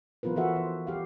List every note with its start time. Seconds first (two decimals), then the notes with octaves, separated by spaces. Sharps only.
0.23 F3 B3 F4 A#4 B4
0.36 E3 F#4 A4 E5 F#5
0.56 C5
0.87 G4 F5